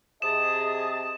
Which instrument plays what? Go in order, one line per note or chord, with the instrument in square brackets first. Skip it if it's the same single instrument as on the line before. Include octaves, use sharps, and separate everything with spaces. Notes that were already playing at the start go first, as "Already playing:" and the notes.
[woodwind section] C3 A5 [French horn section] G#4 D#5 [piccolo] D#6 [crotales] E7